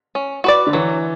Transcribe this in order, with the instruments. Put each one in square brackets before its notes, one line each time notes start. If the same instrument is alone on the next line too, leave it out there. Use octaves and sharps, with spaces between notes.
[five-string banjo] C#4
F#4 B4 D5
[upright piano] D3
[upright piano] E3 [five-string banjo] F#3